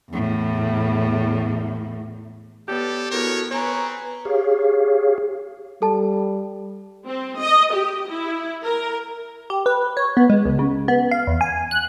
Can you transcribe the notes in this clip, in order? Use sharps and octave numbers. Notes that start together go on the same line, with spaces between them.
E2 A2
B3 G4 A4 C#5 D5
B3 E4 F#4 A4 A#4 C#5
B3 C4 B4 C#5 G#5 A#5
G4 G#4 C#5 F5
G3 A4 A5
C4
D#5
G4
E4
A#4
G4
B4
C#5
B3
G#3
C#2
C#3
B3
F5
E2
G#5
F#6